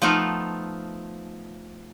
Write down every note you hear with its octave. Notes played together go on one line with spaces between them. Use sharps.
F3 A3 B3 D#4 F4